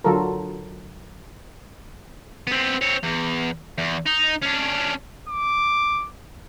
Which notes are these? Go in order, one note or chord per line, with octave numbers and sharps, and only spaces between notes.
D3 F#3 F4 A4 A#4
B3 C4
C4 C#5
E2
E2
D#4
C#4 D4
D6